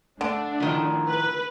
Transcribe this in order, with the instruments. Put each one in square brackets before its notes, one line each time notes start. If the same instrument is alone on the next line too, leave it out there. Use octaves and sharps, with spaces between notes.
[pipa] D3 [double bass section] A3 [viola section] D4
[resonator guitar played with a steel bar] A2 D#3 F3
[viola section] B4